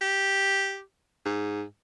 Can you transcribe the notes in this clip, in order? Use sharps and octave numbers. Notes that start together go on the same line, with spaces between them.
G4
G#2